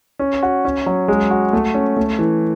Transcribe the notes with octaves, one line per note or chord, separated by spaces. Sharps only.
C#4
F#4
C#4
F#3
G#3
F#4
A3
C#4
A3
E3